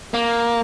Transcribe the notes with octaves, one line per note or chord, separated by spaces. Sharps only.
A#3